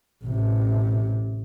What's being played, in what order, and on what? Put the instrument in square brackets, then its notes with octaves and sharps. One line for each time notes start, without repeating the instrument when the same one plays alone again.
[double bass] A1 C3